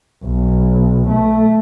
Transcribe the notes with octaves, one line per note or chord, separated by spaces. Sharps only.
B1
A3